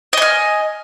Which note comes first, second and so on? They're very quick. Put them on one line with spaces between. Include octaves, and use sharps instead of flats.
D#5 G#5 F6